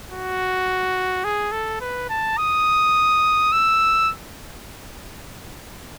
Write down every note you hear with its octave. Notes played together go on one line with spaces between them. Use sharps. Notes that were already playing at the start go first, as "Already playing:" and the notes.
F#4
G#4
A4
B4
A5
D#6
E6